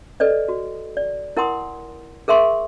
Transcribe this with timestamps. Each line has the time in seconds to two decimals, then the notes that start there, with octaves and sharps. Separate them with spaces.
0.20 A4 B4 D5 D#5
0.48 F#4
0.97 D5
1.37 E4 A#4 F#5 G#5 C6 D#6
2.28 G#4 A#4 E5 C6 C#6